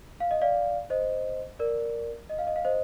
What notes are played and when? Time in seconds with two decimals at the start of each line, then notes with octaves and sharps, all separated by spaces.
0.20 F5
0.31 D#5
0.41 D5 F5
0.90 C5 D#5
1.59 A#4 D5
2.30 D#5
2.38 F5
2.47 D#5
2.56 F5
2.65 C5 D#5